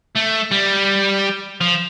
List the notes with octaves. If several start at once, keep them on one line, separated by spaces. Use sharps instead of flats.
A3
G3
F3